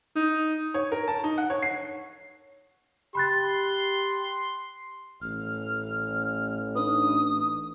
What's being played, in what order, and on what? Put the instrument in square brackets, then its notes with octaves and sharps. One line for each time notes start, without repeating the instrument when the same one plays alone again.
[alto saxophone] D#4
[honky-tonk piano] C#5
A#4
A5
D#4
F#5
C#5
C7
[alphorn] G4 [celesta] B5 F#6 A6 [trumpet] C6
[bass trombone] A1 [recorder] F6
[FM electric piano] D4 D#4 B4 [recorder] D#6